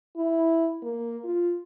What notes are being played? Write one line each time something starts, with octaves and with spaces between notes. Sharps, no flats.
E4
A#3
F4